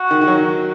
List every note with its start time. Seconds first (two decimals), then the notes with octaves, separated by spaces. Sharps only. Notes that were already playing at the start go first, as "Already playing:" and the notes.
Already playing: F#4
0.11 D#3
0.21 D#3
0.27 F#3